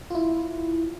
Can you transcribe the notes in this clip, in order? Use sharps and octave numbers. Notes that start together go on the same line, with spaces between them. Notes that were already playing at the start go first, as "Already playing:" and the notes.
E4 F4